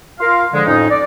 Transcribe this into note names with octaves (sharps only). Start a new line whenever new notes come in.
F4 A#4 F5
D3 F3 G#3
F2 A2 C#4 D#4
D5